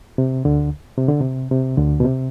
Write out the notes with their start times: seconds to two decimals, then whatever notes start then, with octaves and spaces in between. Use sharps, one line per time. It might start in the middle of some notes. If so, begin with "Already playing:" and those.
0.18 C3
0.45 D2 D3
0.98 C3
1.09 D3
1.21 C3
1.51 C3
1.77 D2 D3
2.00 B2
2.04 C3